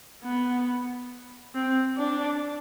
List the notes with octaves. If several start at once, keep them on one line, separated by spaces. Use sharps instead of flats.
B3
C4
D4